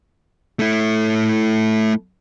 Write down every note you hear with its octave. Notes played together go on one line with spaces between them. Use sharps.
A3 E4